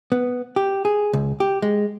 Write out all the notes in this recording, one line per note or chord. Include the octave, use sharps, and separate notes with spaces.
B3
G4
G#4
C#2
G4
G#3